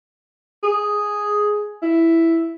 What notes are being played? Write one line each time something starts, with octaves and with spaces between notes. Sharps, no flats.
G#4
E4